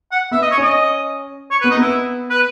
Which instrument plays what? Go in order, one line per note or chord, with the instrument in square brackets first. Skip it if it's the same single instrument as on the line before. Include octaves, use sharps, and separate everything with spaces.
[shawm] F#5
[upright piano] B3 [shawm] E5
[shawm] D#5
C#5
[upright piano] C#4 [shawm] D#5
[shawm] C#5
B4
[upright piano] B3
[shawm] D#4
[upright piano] B3 [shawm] E4
[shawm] B4